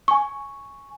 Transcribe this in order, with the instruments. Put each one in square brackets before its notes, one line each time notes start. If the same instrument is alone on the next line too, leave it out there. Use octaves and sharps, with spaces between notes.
[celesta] G#5 C#6